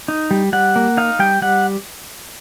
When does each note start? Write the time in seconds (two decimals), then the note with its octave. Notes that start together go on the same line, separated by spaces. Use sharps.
0.08 D#4
0.31 G3
0.53 G3 F#5
0.76 A#3
0.97 D#4 F5
1.19 G3 G5
1.42 G3 F#5